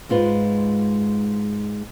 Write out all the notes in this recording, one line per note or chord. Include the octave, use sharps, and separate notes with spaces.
G#2 G#3 F4 B4